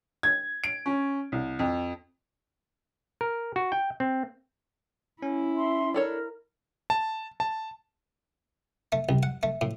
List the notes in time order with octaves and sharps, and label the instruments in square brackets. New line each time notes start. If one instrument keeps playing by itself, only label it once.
[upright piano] G#6
D7
C#4
C2
F2
[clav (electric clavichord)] A#4
F#4
G5
C4
[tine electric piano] C#4 [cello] E4
[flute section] E5 C6
[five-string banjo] D4 A4 C#5 [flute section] A#4
[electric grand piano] A5
A5
[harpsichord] A3
C2
F#5
A3
A2